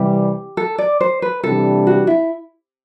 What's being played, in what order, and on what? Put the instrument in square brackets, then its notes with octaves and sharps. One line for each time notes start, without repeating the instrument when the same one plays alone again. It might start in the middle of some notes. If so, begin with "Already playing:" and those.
Already playing: [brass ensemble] C3 E3 G3 [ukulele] G4
[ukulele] A4
D5
C5
B4
[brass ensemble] C3 E3 G3 D4 [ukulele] A4
[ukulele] F#4
E4